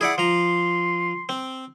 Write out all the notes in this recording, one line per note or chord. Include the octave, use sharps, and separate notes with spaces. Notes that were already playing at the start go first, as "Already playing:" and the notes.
E4 G#4 D5 F#5
F3 A#5 C6
C4